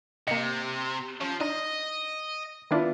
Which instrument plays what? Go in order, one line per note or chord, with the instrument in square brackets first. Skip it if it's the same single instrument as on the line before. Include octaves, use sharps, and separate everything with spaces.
[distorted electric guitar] C3 [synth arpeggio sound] A#3 D#5 [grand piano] C#7
[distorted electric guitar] F3 [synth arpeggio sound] C#4
[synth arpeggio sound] D4 D#4 [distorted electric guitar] D#5
[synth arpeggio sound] D#3 D4 [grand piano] B3 E4 F4